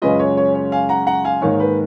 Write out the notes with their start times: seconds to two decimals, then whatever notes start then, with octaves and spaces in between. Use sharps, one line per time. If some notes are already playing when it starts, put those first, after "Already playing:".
0.02 F#2 C#3 G#3 C#4 F4 B4 D#5
0.19 C#5
0.37 C#5
0.55 C#5
0.72 F5 G#5
0.89 F#5 A#5
1.07 F#5 A#5
1.25 F5 G#5
1.42 G#2 D#3 A#3 D#4 C#5 F5
1.60 B4